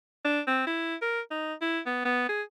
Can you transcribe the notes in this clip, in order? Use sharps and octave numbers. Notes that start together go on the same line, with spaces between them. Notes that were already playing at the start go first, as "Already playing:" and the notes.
D4
C4
E4
A#4
D#4
E4
B3
B3
G#4